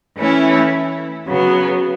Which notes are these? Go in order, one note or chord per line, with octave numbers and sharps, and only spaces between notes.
E3 A3 C#4 E4
C#3 F#3 B3